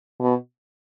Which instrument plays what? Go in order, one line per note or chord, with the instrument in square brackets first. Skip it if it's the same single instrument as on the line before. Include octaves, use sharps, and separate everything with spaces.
[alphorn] B2